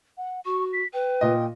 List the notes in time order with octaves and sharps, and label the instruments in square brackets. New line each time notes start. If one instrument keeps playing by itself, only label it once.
[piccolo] F#5
[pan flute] F#4 [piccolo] C#6
[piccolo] B6
[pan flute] B4 [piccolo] G5
[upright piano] A#2 D#5